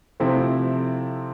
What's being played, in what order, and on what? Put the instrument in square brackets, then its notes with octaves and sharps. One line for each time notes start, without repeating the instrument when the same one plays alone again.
[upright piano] C3 F3 A3 C4 E4